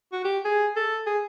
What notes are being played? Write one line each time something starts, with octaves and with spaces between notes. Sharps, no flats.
F#4
G4
G#4
A4
G#4